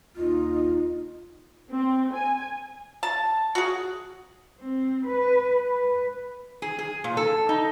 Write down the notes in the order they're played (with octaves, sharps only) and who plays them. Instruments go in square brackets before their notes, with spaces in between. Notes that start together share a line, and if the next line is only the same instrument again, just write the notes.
[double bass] D#2 D#4 [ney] F4
[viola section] C4
G#5
[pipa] A5
F#4 G#4
[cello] C4
B4
B4
[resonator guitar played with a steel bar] G#4
G#4
A#2
A4
D#4